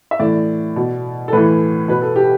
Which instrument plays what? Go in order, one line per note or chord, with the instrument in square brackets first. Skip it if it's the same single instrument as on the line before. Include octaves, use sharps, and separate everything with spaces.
[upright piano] E5
A2 E3 D5
B2
A4
A2 E3 B4
B2 B4
A4
G4